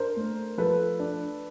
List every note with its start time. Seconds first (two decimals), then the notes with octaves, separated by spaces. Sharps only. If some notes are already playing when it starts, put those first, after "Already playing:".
Already playing: D4 A#4 C5
0.16 A3
0.58 F3 A4 B4
0.99 D4